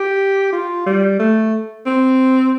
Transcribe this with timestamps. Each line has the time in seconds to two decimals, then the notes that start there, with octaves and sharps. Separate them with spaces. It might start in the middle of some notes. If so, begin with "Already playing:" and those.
Already playing: G4
0.52 F4
0.86 G3
1.19 A3
1.86 C4